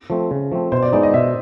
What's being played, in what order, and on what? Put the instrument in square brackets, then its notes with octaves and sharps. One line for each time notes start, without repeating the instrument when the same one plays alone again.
[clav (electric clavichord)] F3 A3 C4
C#3
F3 A3 C4
[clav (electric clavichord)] B2 [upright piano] C5
[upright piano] D5
[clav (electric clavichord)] G#3 B3 D#4 [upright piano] D5
[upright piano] D#5
[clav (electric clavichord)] B2 [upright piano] E5